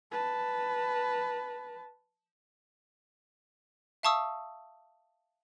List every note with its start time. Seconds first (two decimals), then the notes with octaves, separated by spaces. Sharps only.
0.11 B4 A5
4.03 E5 F5 A5 C#6 D#6 E6